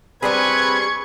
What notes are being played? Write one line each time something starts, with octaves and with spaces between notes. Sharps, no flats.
G3 C4 D4 G#4 B4 B5 C#6 G#6